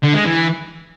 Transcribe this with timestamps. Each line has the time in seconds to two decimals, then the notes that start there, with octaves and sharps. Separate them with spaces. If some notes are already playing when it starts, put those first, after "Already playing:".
0.03 D3
0.14 G#3
0.25 E3